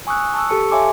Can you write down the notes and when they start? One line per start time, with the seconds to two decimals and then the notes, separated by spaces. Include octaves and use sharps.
0.07 G#5 C#6 D#6 E6 F#6
0.34 A5 C#6 E6
0.49 G4 A4 A5 C#7
0.71 C#5 E5 F5 G#5 C6 D6